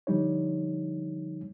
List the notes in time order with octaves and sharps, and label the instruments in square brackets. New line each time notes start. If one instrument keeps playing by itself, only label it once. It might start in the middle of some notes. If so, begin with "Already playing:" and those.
[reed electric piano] D3 F3 G3 D#4 C#5